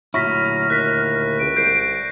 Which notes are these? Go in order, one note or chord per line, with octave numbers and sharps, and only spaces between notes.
D2 A#2 F#3 E4 C#6 F6 A#6 B6
D#2 F#6 A#6 B6
C#2 D7
C2 G6 C7